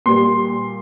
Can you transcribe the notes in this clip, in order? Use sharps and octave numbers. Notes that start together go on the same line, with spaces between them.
A#2 G3 A#3 C6